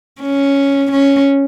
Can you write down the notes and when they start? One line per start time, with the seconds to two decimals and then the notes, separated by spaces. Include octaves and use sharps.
0.22 C#4
0.91 C#4